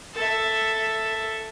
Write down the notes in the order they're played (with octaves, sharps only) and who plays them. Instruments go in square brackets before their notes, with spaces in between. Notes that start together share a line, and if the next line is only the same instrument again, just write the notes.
[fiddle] A4 E5